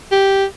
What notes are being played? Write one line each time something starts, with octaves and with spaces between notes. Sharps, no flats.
G4